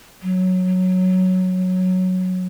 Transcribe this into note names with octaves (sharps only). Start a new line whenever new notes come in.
F#3